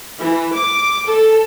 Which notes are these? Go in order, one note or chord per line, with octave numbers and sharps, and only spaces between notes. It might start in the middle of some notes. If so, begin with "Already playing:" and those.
E3
D6
A4